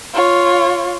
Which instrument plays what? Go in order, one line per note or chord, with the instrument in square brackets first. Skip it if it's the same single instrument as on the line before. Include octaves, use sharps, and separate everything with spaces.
[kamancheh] F4 C#5